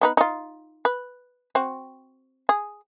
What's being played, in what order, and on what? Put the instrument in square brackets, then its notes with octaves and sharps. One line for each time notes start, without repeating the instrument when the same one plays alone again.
[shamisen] B3 D#4 B4
D#4 F4
B4
C4 F#4
G#4